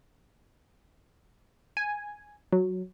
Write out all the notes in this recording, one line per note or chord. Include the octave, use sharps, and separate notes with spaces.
G#5
F#3